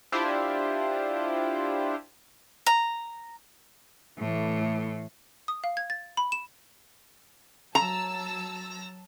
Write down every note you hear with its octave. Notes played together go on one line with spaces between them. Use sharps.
D4 E4 F4 G4 C5
A#5
A2 E3 A3
D#6
F5
G#6
A6
B5
E7
F#3 A5 A#5 E6